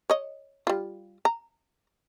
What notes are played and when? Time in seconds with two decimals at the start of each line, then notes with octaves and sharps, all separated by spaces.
0.10 C#5 D#5
0.67 G3 F4
1.25 A#5